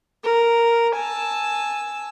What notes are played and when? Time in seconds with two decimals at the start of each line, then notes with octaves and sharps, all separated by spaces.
0.23 A#4
0.95 G#5 A5 E6